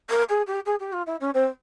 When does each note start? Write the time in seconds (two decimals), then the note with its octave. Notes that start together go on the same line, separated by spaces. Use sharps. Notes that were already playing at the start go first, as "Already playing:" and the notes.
0.10 A#4
0.29 G#4
0.47 G4
0.65 G#4
0.80 G4
0.93 F4
1.06 E4
1.20 C#4
1.34 C4